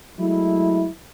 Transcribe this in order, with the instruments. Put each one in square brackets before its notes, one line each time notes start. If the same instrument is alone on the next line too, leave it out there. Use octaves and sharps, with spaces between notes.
[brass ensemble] F#3 G#3 A3 E4